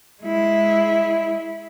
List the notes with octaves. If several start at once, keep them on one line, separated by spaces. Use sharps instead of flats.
G#3 E4